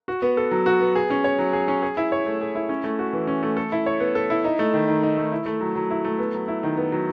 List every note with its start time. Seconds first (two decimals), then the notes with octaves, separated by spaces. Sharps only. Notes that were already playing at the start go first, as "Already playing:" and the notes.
0.08 F#4
0.22 B3
0.37 A4
0.51 F#3
0.66 F#4
0.81 B3
0.95 G#4
1.10 C#4
1.24 C#5
1.39 F#3
1.53 G#4
1.68 C#4
1.82 G#4
1.97 E4
2.12 C#5
2.26 A3
2.41 G#4
2.55 E4
2.69 C#4
2.84 A3
2.99 F#4
3.13 E3
3.27 C#4
3.43 A3
3.57 A4
3.72 E4
3.86 C#5
4.00 B3
4.15 A4
4.30 E4
4.44 D#4
4.59 A3
4.74 D#3
4.88 D#3
5.03 D#4
5.17 A3
5.32 E4
5.46 A3
5.61 F#3
5.75 F#3
5.90 E4
6.04 A3
6.19 B3
6.34 F#3
6.48 E4
6.63 D#3
6.77 B3
6.92 F#3